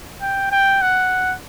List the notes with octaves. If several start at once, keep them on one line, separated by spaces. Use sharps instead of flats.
G5
G5
F#5